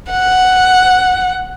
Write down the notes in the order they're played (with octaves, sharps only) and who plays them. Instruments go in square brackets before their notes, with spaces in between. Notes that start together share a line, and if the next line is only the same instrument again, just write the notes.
[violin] F#5